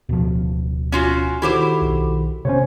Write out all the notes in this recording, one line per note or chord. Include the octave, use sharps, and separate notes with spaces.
D1 B2 F3
C#4 F4 F#4
D#3 E4 F#4 G4 A4 C5
B1
C3 A3 B3 C#4 C5 C#5